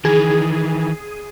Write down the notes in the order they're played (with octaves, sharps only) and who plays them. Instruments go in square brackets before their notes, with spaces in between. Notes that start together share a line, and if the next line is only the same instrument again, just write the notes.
[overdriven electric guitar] D#3 E3 [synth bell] G#4